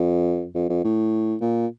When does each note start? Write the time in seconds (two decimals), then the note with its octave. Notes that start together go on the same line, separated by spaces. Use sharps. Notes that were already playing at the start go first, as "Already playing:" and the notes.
Already playing: F2
0.55 F2
0.69 F2
0.84 A2
1.41 A#2